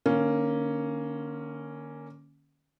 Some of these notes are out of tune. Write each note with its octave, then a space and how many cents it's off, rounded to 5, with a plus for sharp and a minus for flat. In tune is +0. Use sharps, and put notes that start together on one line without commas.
D3 +35 A#3 +0 C#4 +0